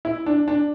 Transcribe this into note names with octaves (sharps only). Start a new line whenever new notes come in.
E4
D4
D4